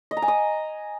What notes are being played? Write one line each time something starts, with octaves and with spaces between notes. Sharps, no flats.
D#5
A#5
G#5
D#6